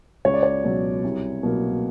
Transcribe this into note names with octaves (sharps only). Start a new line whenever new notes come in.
C#2 C#5
D5
C#5
B2 F#3
C2
B2 F#3 A#3